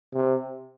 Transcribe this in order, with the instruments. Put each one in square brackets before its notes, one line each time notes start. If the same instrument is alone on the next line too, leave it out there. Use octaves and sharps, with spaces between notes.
[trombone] C3